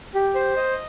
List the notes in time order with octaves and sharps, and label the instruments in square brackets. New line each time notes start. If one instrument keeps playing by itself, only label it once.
[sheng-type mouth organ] G4
C5
D#5